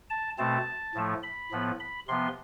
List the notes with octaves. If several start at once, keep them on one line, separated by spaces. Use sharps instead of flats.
A5
B2 A3 C4 A5
A2 F3 A3
B5
A2 F3 B3
B5
C3 F3 B3 C6